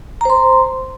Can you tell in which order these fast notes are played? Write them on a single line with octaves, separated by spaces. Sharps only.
A#5 C5 C6